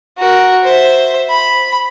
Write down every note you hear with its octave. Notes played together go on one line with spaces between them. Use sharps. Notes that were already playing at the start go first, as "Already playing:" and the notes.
F#4 A#4
C5 E5
B5